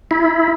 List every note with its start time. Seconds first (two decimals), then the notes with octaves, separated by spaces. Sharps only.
0.11 E4